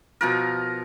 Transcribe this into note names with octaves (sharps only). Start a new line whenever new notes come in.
B2 F3 A#4